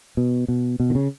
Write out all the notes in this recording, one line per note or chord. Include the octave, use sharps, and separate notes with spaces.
B2
B2
B2
D#3
C#3